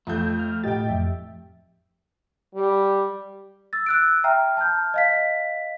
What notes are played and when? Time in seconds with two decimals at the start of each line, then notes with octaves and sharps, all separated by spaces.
0.07 F2 A3 G6
0.39 F6
0.64 A2 G4 D#5 G5 A6
0.89 F2 E5
2.55 G3
3.73 E6 A6
3.86 E6 F#6 D7
4.24 E5 G5 A#5 F6
4.57 A5 F6 G6
4.94 D#5 F5 B6